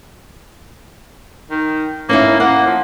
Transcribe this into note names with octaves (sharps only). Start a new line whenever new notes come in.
D#3
A#3 C#4 D#4 E4
A#3 F#5
F3